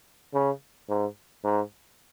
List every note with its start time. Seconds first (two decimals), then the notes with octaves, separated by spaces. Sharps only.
0.34 C#3
0.89 G#2
1.44 G#2